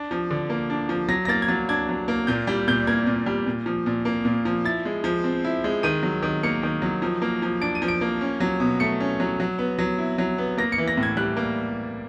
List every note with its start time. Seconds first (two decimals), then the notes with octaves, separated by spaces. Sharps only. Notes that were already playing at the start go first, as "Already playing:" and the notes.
Already playing: D4
0.11 F3
0.31 D3
0.50 A#3
0.70 D4
0.89 F3
1.08 F#3 A#6
1.25 A#6
1.28 A#3 A6
1.42 G#6
1.48 F#3 A6
1.69 D4 G#6
1.89 F#3
2.08 A#3
2.27 A#2 G6
2.47 G3 G6
2.68 A#2 G6
2.87 A#3 G#6
3.07 A#2
3.26 G3
3.47 A#2
3.66 F3
3.86 A#2
4.05 A#3
4.25 A#2
4.45 F3
4.65 E4 A6
4.85 G#3
5.04 F3
5.24 C4
5.44 E4
5.64 G#3
5.83 D#3 D#7
6.03 F#3
6.23 D#3
6.43 A#3 C#7
6.63 D#3
6.82 F#3
7.02 F3
7.22 A#3
7.42 F3
7.61 D4 D7
7.75 D#7
7.82 F3
7.88 D7
8.01 A#3
8.21 C#4
8.40 F#3
8.60 B2
8.80 A3 C#7
9.00 C#4
9.20 F#3
9.40 F#3
9.59 B3
9.79 F#3
9.98 E4
10.18 F#3
10.38 B3
10.58 A#3 A#6
10.72 C#7
10.78 E3
10.88 A#6
10.97 A2
11.03 G#6
11.17 G3 F#6
11.37 A#3